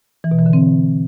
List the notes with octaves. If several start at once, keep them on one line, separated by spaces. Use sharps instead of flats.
E3
B2
E3
D3
C4